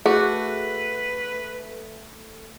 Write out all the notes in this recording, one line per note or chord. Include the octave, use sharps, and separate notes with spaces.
A3 F#4 G#4 B4